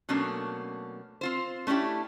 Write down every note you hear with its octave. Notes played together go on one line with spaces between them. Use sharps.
B2 F#3 A3 A#3 C#4 D4
C4 F4 C5
A3 C#4 D4 E4 G4